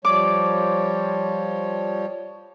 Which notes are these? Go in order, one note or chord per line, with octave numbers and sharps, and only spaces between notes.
F3 G3 C#5 D6